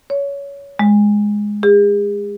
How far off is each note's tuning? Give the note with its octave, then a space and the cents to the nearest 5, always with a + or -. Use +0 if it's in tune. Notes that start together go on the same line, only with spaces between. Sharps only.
C#5 +20
G#3 +0
G#4 -40